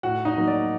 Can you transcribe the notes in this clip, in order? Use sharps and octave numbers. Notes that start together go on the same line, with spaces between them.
A2 F#4 F#5
D#4 D#5
F#3 A#3
D5